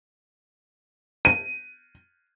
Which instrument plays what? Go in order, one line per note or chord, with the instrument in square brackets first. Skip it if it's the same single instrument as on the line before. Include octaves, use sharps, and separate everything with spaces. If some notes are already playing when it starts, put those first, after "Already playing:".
[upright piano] D#7